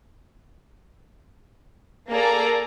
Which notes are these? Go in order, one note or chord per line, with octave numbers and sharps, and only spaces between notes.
A#3 G#4 A4 D5 A#5